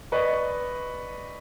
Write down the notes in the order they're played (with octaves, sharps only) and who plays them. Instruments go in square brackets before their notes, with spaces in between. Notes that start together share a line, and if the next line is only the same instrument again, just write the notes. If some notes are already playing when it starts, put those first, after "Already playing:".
[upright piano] B4 D5 D#5 C#6